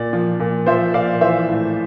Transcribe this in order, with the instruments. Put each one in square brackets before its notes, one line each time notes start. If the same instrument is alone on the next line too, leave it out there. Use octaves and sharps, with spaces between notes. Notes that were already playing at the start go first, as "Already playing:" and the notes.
Already playing: [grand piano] A#2 D5
F3
A#2
F3 C5 E5
A#2 D5 F5
E3 C5 E5
A2